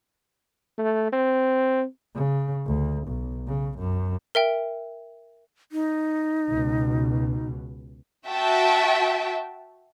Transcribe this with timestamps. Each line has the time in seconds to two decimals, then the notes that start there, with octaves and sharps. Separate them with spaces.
0.78 A3
1.12 C4
2.15 C#3
2.66 D2
3.08 B1
3.48 C#3
3.79 F#2
4.35 A#4 E5 G5
5.72 D#4
6.51 C#2 B2
8.28 F#4 E5 G5 A5